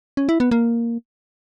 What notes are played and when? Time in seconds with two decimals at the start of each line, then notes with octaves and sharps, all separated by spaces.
0.17 C#4
0.29 E4
0.40 B3
0.51 A#3